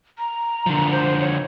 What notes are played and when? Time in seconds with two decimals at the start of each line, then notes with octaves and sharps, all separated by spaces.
0.18 A#5
0.66 D3 F3
0.91 C5
1.20 C#5